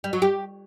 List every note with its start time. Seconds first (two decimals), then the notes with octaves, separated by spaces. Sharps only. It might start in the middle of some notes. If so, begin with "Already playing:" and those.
0.04 G3
0.13 F#3
0.22 G4